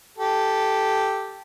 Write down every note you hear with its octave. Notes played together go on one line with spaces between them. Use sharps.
G4 A4